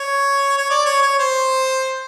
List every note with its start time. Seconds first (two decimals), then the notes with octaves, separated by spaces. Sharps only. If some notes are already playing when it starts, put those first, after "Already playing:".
Already playing: C#5
0.58 C#5
0.70 D5
0.86 C#5
1.02 C#5
1.19 C5